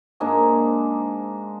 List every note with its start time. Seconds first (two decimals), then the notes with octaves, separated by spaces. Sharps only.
0.20 G#2 G#3 A#3 D4